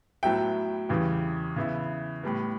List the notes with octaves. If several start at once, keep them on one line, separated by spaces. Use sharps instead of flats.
A2 F#3 B3 E4 G5
E2 C#3 E3 G3
C#3 E3 B3 E4
A2 G3 B3